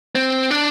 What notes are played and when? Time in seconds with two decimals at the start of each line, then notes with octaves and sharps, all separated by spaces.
0.15 C4
0.51 D4